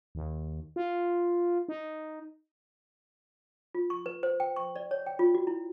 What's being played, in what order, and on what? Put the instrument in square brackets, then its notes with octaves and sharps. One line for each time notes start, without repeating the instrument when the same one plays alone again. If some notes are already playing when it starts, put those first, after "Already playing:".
[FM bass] D#2
F4
D#4
[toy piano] F4
C#6
B4
C5
G5
C#6
D5
C#5
G5
F4
F#4
E4